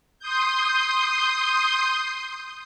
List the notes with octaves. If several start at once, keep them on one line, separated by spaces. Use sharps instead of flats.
C6 D#6 G6